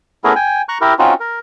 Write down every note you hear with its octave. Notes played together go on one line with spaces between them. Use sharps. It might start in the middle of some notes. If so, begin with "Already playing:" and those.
A3 B3 C#4 E4 G#4 A#4
G5 G#5
A#5 C#6 F#6
E4 G4 A#4
C4 C#4 D#4 F4 F#4
A#4